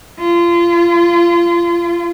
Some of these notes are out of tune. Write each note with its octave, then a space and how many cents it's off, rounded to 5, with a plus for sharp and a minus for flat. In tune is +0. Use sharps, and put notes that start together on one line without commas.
F4 -30